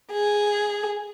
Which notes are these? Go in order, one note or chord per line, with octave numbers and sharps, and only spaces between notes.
G#4